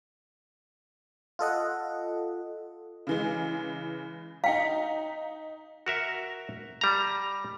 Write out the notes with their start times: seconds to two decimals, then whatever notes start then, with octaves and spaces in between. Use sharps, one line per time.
1.39 F4 A4 D#5 F#5
3.07 C#3 E3 G#3
4.44 D#4 F5 G5 A#5
5.86 F#4 A#4 E5
6.81 G3 A#5